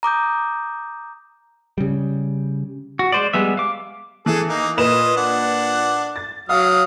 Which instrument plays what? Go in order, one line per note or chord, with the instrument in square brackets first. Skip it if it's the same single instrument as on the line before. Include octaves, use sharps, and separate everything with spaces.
[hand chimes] A#5 D6 D#6 G6
[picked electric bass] C#3 G3
[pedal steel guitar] F#4
G#3 C5 D5
G3 G#3 B3 E5
F5 D6
[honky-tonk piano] E3 [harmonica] G#4 A4
[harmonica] A#3 D#4
[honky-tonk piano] A#2 B4 E7 [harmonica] F4 D#5
[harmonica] D4 F#5
[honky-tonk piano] A6
[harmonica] F#3 D#6 F6 [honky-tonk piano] F5